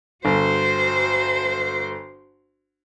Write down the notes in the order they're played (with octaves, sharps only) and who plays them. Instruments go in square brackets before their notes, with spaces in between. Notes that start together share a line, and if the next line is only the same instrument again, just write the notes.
[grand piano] G1 [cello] F#4 C5